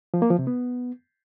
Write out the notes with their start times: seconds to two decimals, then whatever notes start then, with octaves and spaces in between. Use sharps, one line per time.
0.14 F3
0.22 A#3
0.30 F3
0.39 C3
0.47 B3